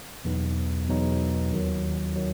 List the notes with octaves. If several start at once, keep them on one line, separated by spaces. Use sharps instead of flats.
E2 B2 F#3 B3 D#4
E2 B2 F#3 B3 D#4
D#2 D#3 F#3
D#3 F#3